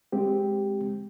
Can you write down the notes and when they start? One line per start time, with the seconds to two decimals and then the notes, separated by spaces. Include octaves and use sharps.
0.12 G#3 C4 G4